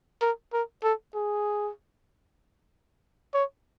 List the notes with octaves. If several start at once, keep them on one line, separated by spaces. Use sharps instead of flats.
A#4
A#4
A4
G#4
C#5